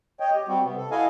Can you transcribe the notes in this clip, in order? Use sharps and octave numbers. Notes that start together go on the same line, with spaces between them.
C#5 D#5 G5
G4
G3 C4 F#4
C3 B3
A4
E4 F#4 A4 D#5 F5 G#5